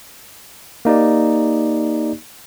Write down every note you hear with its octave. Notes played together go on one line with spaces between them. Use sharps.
A#3 D#4 G4 D5